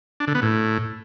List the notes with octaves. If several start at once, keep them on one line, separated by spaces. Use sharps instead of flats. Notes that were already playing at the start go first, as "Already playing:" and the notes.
D4
D3
B3
A2